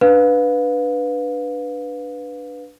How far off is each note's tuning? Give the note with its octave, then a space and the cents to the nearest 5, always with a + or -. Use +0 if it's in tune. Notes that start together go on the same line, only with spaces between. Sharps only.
D4 +0 B4 +0 F5 +25